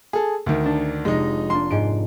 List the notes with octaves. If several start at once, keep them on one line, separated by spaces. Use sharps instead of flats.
G#4 A4
D2 D#3
D4
F1 G#3 D#4
A#3 D4 C6
G#2 D7